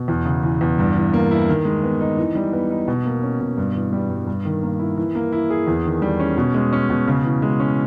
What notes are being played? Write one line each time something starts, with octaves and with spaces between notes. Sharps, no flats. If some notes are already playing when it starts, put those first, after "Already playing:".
Already playing: B2
E2
C#3
E3
E2
G2
E3
A#3
E4
D#3
G#3
B3
D#4
E3
G3
B3
D#4
B2
A#3
C#4
B2
G2
E3
G3
G2
G2
D#3
A#3
E4
E3
A#3
E4
G#4
E2
D#3
G3
C#4
B2
G#3
C#4
B2
C#3
E3
G#3
C#4